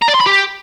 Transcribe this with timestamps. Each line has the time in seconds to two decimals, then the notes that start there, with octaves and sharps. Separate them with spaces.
0.02 A#5
0.08 D5
0.14 C6
0.21 B5
0.27 G4